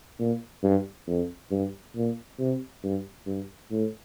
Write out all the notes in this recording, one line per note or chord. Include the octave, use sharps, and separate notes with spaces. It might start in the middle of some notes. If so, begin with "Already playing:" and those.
A#2
G2
F2
G2
A#2
C3
G2
G2
A2